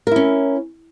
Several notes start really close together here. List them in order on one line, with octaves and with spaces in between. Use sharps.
A#4 E4 C#4